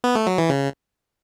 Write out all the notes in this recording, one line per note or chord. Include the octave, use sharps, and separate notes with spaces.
B3
A3
F#3
E3
C#3